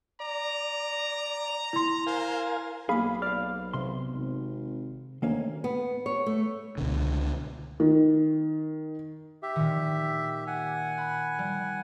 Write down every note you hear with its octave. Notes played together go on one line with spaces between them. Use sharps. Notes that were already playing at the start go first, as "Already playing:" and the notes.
D5 A#5
E4 C6
A#4 C5 F5 G#5
B1 A#3 G#4 F5 B5
D5 F5 F6
C3 C6
G#1
D2 D#3 A#3 C#4
B3
C#5
A3
C#2 B2 D3
D#3
G4 E5
A#2 D#3
F#5 G#5
B5
G3